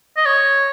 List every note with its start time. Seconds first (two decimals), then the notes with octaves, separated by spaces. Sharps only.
0.17 D#5
0.26 C#5